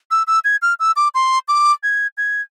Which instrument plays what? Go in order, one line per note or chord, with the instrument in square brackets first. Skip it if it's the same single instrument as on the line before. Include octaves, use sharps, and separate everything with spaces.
[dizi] E6
E6
G#6
F6
E6
D6
C6
D6
G#6
G#6